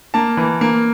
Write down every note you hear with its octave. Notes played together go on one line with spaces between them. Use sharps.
A#3 A5
E3
A#3